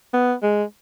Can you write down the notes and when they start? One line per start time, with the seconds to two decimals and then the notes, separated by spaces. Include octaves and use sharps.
0.14 B3
0.43 G#3